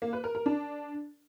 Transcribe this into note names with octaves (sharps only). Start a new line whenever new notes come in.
A#3
B4
A#4
A#4
D4